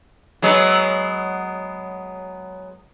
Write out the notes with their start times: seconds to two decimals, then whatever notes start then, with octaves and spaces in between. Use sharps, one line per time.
0.42 F#3 G#3 B3